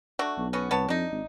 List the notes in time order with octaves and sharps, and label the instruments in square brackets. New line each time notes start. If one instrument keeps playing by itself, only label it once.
[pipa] A3 D4 F#4
[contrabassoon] B1
[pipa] B3 C#4 F#4
[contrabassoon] C2 [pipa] B3 C#5 A5
[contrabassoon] F2 [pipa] D4 D#4
[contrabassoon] G#1